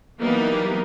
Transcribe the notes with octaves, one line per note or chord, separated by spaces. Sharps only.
E3 F#3 G3 A#3 B3 D#4